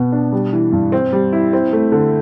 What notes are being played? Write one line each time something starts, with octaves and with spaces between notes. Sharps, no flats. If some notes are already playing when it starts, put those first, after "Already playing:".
Already playing: B2 B3
D4
G3
E3
G2
C4
G3
E4
C4
A3
D3